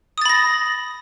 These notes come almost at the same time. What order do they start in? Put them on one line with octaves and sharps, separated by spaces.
D#6 A6 B5 A#6